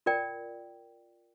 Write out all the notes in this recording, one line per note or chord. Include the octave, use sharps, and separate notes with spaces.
F4 A#4 D5 G5